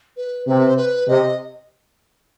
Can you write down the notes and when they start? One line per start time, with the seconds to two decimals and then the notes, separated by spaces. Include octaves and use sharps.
0.17 B4
0.47 C3 B4
0.67 C5
0.77 B4
1.08 C3 D#5